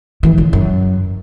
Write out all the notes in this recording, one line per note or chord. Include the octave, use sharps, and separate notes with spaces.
E3
C#3
F#2